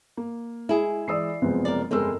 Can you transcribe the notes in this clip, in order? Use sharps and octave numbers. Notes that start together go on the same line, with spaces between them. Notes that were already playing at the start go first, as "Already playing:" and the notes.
A#3
G#3 E4 G#4 G#5
E3 G#3 D5 D#6 E6 C7
F#1 C3 F3 G#3 B3 C4
A#4 D5
G1 F2 C#3 G#3 A4 A#4 C5 E6